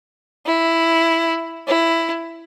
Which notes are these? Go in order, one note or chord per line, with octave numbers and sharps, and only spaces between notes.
E4
E4